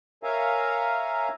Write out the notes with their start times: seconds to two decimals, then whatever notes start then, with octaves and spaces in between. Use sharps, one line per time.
0.23 A#4 C#5 E5 F5 G#5 A#5